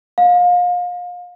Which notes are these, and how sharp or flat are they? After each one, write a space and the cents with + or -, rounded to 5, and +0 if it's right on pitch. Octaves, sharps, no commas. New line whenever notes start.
F5 +30